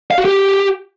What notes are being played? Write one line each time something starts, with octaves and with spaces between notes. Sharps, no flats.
F5
F#4
G4